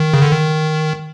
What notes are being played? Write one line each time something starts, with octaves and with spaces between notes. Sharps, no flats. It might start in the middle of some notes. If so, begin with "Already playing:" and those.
Already playing: D#3
C#3
D3
D#3